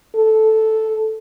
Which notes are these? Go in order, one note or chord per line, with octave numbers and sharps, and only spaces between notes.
A4